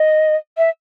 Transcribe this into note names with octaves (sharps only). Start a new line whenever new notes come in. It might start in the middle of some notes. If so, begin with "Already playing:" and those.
Already playing: D#5
E5